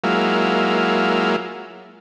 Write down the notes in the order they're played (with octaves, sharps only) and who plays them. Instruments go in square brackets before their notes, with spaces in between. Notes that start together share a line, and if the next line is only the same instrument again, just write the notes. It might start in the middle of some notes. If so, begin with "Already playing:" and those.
[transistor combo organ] F#3 G#3 A#3 E4 F4